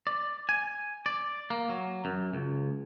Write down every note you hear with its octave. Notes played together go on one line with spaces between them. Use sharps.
D5
G#5
D5
A#3
F#3
F#2
C#2